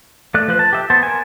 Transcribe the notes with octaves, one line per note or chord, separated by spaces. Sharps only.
A3 D5 F#6
F3 B4 C5 F#6
A5
G4 E5
B3 C5 A5
A#4 G#5